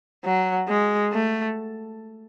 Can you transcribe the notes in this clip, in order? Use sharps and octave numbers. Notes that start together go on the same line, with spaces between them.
F#3
G#3
A3